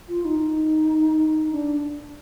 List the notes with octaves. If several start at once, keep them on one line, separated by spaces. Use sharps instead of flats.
F4
D#4
D#4
D4